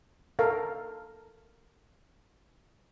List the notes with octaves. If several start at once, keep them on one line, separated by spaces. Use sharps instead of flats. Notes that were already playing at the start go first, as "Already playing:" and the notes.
A4 A#4 F5